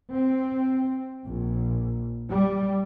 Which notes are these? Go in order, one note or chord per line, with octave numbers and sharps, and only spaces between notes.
C4
A#1
G3